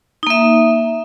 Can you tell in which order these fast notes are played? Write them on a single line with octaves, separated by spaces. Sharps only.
D#4 A#3 E5